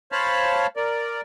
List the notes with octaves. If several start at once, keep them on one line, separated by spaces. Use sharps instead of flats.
C5 C#5 F5 A5 B5
A#4 D5